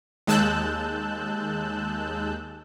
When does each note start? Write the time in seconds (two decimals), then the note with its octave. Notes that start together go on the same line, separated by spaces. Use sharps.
0.27 D#2 G#3 A5 E6 F#6 G6